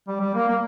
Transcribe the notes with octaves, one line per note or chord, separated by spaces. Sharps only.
G3
G3
A#3
A#3